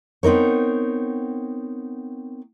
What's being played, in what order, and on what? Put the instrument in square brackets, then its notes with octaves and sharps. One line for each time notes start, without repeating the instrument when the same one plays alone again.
[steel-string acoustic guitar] B3 C4 D#4 A#4 C#5